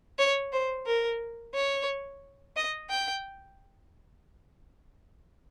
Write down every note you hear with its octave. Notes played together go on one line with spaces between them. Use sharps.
C#5
C5
A#4
C#5
D#5
G5